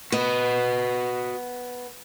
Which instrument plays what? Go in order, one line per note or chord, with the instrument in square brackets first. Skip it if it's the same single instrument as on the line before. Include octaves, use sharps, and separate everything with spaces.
[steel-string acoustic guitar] B3 [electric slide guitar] F#4 D#5